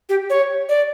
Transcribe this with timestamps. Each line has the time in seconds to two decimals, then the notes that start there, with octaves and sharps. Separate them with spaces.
0.09 G4
0.30 C#5
0.69 D5